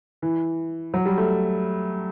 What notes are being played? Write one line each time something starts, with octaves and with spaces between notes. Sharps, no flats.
E3
F#3
G3
A3